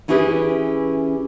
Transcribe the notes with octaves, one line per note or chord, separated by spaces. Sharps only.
E3 C#4 E4 G4 G#4 B4